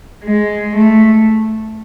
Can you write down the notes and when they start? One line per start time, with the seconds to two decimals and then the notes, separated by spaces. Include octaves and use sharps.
0.24 G#3
0.76 A3